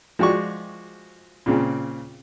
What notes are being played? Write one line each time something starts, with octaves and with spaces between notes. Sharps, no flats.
F3 G#3 F#4 D5 C#6
A#2 C#3 C4